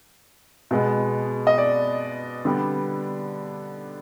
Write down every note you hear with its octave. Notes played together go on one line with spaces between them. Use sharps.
B2 G#3 B3
D#5
D5
D3 G3 B3